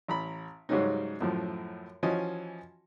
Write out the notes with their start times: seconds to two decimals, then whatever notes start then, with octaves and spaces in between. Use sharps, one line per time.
0.08 A1 A#5 B5
0.69 G#2 C#3 F#3 G3 C#4 D#4
1.21 F#2 A2 F3
2.03 E3 F3 C#4 F#4 D#5 G#5